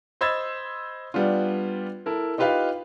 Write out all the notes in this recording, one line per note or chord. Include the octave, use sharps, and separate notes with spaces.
C5 D#5 B5 E6 G#6 A6
G3 B3 D4 F4
E4 A4 A#4
D#4 F4 G4 B4 F5